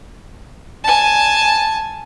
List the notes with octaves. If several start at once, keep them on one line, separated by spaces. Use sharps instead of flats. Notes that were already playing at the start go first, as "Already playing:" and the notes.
G#5 A5